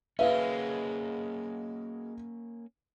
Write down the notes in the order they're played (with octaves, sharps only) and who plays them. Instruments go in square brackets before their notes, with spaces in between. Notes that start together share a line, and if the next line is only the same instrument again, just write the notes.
[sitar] B2 G#3 [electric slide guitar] A#3 C#4 [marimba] B4 [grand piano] E5 F5